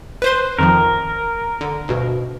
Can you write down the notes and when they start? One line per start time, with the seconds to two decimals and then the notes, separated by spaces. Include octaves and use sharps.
0.22 B4 C5 C6
0.59 F2 D#3 F3 A#4
1.61 D3
1.88 D2 G2 B2